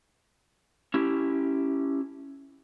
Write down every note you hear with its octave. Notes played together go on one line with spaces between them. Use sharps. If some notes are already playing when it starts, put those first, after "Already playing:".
C#4 E4 G4